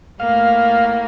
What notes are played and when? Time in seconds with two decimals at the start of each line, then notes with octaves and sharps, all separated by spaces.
0.20 A2 A#3 F5